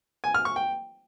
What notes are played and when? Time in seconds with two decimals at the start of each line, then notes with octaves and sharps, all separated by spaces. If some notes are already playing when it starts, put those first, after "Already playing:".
0.24 G#5
0.34 F6
0.45 C#6
0.56 G5